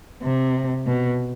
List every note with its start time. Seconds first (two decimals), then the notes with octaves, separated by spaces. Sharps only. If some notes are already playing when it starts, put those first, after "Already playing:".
0.23 C3
0.86 B2